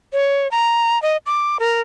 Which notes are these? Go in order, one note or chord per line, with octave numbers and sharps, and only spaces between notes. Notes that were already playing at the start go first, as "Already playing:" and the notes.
C#5
A#5
D#5
D6
A#4